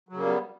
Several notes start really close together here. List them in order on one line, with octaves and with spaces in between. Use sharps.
F#3 C#3 A#3 G3 B3